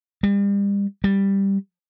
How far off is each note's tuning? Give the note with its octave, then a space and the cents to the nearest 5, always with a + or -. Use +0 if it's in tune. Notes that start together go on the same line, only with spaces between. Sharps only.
G3 +40
G3 +5